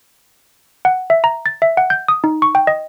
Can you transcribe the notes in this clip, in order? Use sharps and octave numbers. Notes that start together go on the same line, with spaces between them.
F#5
E5
A#5
A6
E5
F#5
G6
D#6
D#4
C#6
G5
D#5